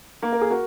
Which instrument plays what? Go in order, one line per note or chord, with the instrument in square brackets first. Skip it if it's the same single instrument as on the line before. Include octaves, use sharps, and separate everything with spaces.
[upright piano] A#3
[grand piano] A#4
G#4
F#4 A#4